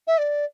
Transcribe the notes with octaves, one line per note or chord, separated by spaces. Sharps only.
E5
D5